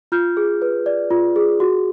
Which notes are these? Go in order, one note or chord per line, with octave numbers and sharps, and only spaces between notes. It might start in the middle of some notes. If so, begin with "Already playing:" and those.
F4 F6 G6
G#4
B4
D5
F4
G#4
F#4